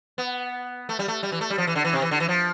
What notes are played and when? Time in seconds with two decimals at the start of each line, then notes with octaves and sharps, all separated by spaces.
0.18 B3
0.89 A3
0.99 G3
1.08 A3
1.23 G3
1.32 E3
1.41 A3
1.50 G3
1.58 F3
1.67 E3
1.75 D3
1.84 E3
1.93 C3
2.02 E3
2.11 D3
2.20 E3
2.28 F3